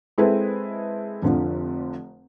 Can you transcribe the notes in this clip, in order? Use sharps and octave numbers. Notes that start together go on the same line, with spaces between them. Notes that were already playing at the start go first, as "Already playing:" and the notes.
G#3 C4 E4 G#4 A4 B4
F1 D3 F3